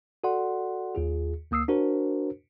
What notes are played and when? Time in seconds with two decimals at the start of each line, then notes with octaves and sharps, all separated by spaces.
0.24 F#4 A4 D5 F#5 C6
0.95 D#2 F4 G#4
1.51 D2 A#3 D#6 E6 C7
1.68 D4 F#4 A#4 C5